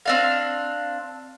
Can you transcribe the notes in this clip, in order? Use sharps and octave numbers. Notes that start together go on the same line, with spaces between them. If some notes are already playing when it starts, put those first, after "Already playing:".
C4 D4 F5